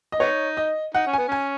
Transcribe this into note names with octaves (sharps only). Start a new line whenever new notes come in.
D#5
B3 D#4 C#5
D#5
D#4 F#5
C#4
B3 G#5
C#4 G#5